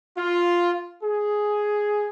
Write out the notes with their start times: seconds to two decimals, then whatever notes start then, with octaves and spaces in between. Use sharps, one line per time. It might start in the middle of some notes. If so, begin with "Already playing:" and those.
0.17 F4
1.03 G#4